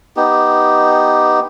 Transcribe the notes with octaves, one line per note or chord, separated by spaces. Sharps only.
B3 D#4 G4